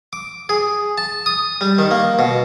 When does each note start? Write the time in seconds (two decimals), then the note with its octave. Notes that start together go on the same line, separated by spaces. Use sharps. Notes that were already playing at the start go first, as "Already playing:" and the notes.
0.13 D6
0.49 G#4
0.98 A5
1.26 D#6
1.61 G3
1.78 D#3
1.91 A#3
2.19 B2